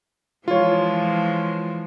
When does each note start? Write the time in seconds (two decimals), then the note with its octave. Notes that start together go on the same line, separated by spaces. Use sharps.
0.48 E3 F3 G#3 F4 C#5